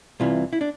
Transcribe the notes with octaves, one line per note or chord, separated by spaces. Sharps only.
C2 C3 E3 F4
E4
D4